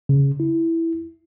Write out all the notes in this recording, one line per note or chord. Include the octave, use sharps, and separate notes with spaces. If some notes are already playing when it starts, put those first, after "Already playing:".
C#3
E4